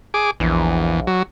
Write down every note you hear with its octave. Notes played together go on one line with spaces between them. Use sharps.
G#4 D6
A#1 E2
F#3